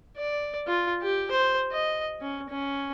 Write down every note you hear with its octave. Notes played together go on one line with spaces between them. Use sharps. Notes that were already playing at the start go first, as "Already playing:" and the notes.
D5
F4
G4
C5
D#5
C#4
C#4